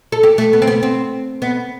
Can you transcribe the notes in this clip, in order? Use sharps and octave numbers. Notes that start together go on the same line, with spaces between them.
A4
G4
A3
B3
C4
B3
C4
B3